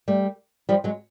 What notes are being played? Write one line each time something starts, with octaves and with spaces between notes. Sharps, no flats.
G3 A3
F3 G3
F#3 G#3